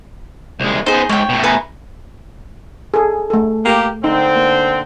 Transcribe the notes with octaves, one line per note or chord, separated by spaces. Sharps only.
C2 G#3
B3 D#4 G#4 C5
G#2 C#5 G5
B2 A3
B4 G#5 A#5
G#4 A4
A3 A4
A#3 G4
D3 C4 D#4
A#3